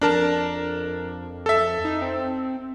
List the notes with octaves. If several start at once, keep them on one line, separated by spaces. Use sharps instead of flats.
F2 D4 A#4 A5
A4 E5
D#4
C4